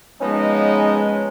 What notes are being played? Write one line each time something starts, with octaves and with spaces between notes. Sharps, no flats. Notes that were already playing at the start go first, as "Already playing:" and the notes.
F3 G#3 B3 C#4 D#4